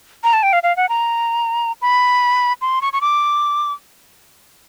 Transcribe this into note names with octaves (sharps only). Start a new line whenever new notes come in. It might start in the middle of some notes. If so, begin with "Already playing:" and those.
A#5
A5
G5
F5
F5
F#5
A#5
B5
C6
C#6
C#6
D6